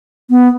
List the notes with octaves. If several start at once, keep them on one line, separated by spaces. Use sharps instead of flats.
B3